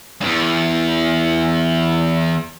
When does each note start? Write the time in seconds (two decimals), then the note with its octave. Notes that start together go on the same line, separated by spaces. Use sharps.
0.21 E2 G2